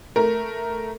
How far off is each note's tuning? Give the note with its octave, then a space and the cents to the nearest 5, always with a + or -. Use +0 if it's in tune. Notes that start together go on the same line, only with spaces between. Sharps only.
A3 +0 A#4 +0